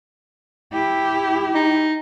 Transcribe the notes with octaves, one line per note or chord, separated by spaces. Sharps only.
E4 G4
D#4